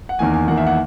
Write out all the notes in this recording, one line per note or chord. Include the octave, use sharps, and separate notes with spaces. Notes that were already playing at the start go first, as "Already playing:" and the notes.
F#5
E2 D#3 A#3 G#5
G#5
E2 D#3 A#3 F#5
E5
F#5